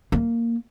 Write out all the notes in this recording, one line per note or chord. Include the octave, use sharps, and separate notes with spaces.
A#3